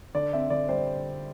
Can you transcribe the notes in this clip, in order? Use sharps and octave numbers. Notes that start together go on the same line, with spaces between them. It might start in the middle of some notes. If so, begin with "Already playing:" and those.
D3 D5
C4 E5
D3 D5
G3 C5